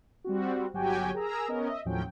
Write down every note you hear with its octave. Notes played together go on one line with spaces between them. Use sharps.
G3 C4 F#4
G1 F#3 F#4 G4 G5 G#5
G#4 A#4 A#5 E6
B3 C#4 A#4 D#5
D#5 E5
D#2 A2 F3 F#3 C#4 G5